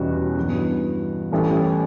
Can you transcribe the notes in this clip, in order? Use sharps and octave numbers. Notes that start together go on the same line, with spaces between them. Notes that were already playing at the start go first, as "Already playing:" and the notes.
Already playing: E2 B2 G3 C#4 F#4
G2 E3 B3 F#4
A1 A2 G3 C#4